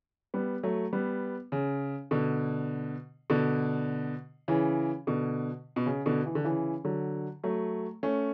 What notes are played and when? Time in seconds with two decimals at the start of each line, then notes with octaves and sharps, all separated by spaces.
0.34 G3 B3
0.63 F#3 A3
0.93 G3 B3
1.52 C#3
2.11 B2 D3
3.30 B2 D3
4.48 C#3 E3
5.07 B2 D3
5.76 B2
5.86 C#3
6.06 B2 D3
6.26 E3
6.35 D3
6.44 C#3 E3
6.85 D3 F#3
7.44 F#3 A3
8.03 A3 C#4